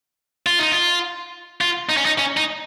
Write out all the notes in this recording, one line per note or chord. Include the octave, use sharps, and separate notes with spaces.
F4
D#4
F4
F4
D#4
C#4
D#4
C#4
D#4